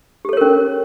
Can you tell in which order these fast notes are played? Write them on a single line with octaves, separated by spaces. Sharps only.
G4 A4 C#5 A#4 C#4